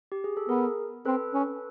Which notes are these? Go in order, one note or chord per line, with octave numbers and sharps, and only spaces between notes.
G4
G#4
A4
B3 G#4 A#4
C4 A4 B4
C#4